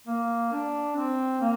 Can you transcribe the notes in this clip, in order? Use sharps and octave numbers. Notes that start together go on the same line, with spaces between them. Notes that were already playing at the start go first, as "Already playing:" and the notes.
A#3
D4
C4
A#3